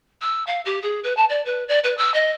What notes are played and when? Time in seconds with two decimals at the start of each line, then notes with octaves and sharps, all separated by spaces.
0.21 E6
0.47 F5
0.65 G4
0.82 G#4
1.03 B4
1.17 A5
1.29 D5
1.45 B4
1.68 D5
1.84 B4
1.97 E6
2.14 D#5